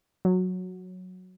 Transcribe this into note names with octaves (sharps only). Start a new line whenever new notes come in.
F#3